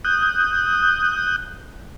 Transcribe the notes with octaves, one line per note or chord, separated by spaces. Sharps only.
D#6 F#6 G6